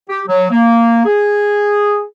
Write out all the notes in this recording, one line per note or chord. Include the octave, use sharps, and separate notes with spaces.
G4
F#3
A#3
G#4